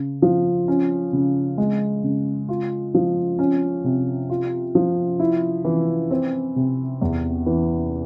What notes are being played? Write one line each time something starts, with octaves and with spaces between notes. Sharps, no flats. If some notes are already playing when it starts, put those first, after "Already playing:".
Already playing: C#3
F3
C#4
C#3
G#3
C#3
F4
F3
C#4
C3
F4
F3
E4
E3
C4
C3
E2
E3